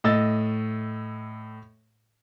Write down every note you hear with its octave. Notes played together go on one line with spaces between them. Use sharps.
A2 D#5 E6 A6